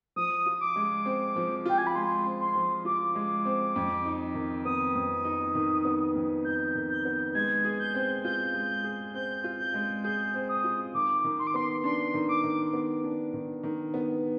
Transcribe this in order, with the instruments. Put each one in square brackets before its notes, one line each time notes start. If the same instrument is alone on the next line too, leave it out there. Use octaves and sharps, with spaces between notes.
[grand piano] F3 [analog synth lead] D#6
[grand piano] F4
[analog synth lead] D6
[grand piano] G#3
C4
F3
[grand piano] F4 [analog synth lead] G5
[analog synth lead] G#5
B5
[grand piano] G#3 [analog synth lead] C6
[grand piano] C4
[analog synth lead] C6
[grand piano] F3
[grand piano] F4 [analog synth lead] D6
[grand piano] G#3
C4
F2
D#4
D#3
[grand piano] B3 [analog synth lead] D#6
[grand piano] F2
D#4
D#3
B3
F2
[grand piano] D#4 [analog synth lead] G6
[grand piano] D#3
[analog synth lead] G6
[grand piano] B3
[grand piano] G#3 [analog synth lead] G#6
[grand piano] G#4
[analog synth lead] G6
[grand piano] C4
[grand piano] F4 [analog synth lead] G6
[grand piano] G#3
G#4
[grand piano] C4 [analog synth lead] G6
[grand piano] F4
[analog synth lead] G6
[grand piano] G#3
[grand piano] G#4 [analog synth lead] G6
[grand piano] C4
[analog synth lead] D#6
[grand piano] F4
[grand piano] D#3 [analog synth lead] D6
[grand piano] D#3
[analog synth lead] C6
D6
[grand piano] B3 [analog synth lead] C6
[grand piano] D4 [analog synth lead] C6
[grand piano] D#3
[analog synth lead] D6
[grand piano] D#3
B3
D4
D#3
D#3
B3